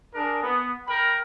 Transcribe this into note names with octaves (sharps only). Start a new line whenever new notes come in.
D4 G#4 A#4
B3
A#4 G5 B5